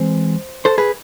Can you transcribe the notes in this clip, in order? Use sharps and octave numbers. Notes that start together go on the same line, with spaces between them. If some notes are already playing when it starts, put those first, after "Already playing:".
Already playing: E3 G#3 C4 C5
A4 C5
G#4 B4